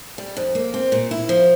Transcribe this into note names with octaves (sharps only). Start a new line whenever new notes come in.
G3
F2
A#3
C4
A#2
E4
F3